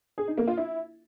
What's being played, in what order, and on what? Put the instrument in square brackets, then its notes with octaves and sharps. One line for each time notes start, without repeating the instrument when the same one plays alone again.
[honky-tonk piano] G#4
D#4
A#3
F4
E4